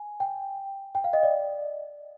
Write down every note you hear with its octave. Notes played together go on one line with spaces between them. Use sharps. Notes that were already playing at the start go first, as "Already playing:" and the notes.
Already playing: G#5
G5
G5
F5
D#5
D5